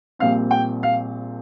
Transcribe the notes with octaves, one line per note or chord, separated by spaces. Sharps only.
A#1 A#2 G3 C4 F5
G5
F5